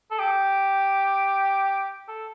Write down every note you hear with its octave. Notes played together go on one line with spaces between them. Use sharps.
A4
G4
A4